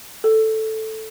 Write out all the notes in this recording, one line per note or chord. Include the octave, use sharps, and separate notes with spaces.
A4